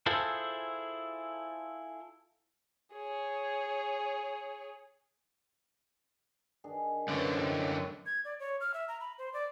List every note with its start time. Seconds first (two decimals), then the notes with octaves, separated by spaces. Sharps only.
0.06 E4 F4 G#4 A4 C5
2.94 G#4 C#5
6.64 D#3 D4 G#4
7.08 F#2 D3 B4 C5 A#5
7.35 G#2 G4
8.06 G#6
8.25 D5
8.40 C#5
8.61 F6
8.74 E5
8.88 A#5
9.01 B5
9.18 C5
9.34 D5